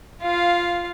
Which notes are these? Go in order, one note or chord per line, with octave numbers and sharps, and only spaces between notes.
F4 F5